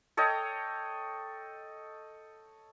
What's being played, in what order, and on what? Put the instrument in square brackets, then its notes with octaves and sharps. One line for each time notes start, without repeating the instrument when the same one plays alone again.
[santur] A4 C#5 D#5 G5